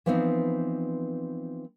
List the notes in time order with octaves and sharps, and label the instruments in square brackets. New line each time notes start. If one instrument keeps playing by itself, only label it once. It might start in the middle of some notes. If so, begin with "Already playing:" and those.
[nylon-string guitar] E3 F3 B3 C4 D4 D#4